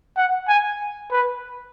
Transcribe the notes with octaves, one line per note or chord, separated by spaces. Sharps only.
F#5
G#5
B4